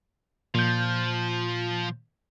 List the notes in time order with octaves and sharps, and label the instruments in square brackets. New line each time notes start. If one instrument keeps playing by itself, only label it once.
[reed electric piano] A#2 G6 [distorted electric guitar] F3